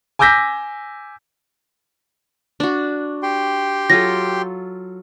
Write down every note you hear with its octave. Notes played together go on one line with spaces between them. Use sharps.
G#5 D6 E6 G6 A#6 B6
D4 F#4
G4 G5 C6
F#3 F4 A4 A#6